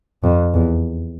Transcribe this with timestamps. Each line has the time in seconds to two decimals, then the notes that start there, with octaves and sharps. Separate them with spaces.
0.24 F2
0.54 E2